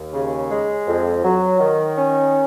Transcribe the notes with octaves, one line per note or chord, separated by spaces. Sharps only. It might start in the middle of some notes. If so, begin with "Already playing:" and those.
Already playing: D#2
C#3
G#3
F2
F#3
D#3
C#4